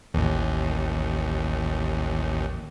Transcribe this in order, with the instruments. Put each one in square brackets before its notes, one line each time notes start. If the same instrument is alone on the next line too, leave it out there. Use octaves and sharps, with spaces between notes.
[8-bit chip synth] A1 D#2